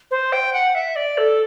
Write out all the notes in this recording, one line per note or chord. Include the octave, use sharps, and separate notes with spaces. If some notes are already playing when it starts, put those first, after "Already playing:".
C5
G5
F#5
E5
D5
A4